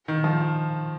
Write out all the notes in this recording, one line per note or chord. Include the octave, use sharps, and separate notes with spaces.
D#3
F3